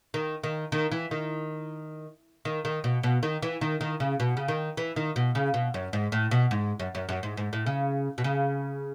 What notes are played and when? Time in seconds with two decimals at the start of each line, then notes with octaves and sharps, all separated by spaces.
0.14 D#3
0.44 D#3
0.72 D#3
0.92 E3
1.11 D#3
2.45 D#3
2.65 D#3
2.84 B2
3.03 B2
3.23 D#3
3.42 E3
3.61 D#3
3.81 D#3
4.00 C#3
4.20 B2
4.37 C#3
4.48 D#3
4.77 E3
4.96 D#3
5.16 B2
5.35 C#3
5.54 B2
5.74 F#2
5.93 G#2
6.12 A2
6.31 B2
6.51 G#2
6.80 F#2
6.95 F#2
7.09 F#2
7.23 G#2
7.37 G#2
7.53 A2
7.66 C#3
8.18 B2
8.24 C#3